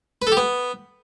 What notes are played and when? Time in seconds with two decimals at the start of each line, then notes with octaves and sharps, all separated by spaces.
0.22 B4
0.27 A4
0.32 G4
0.37 B3